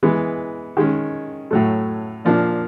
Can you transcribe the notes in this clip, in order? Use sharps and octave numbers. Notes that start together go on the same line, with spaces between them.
E3 G#3 B3
D#3 G#3 C#4
A2 F#3 A3
A#2 F3 A#3 D4